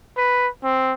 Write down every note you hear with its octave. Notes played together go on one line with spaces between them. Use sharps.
B4
C4